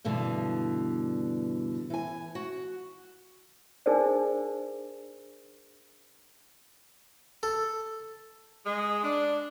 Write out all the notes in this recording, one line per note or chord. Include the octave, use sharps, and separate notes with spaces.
G2 B2 D3 E3
E3 G#5
F#4
D4 D#4 G#4 A#4 C5 D5
A4
G#3
D4